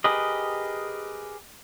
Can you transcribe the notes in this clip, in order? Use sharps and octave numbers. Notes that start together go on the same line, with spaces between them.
G4 G#4 A#4 B4 D#5